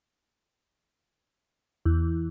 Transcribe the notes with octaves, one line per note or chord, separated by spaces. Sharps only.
E2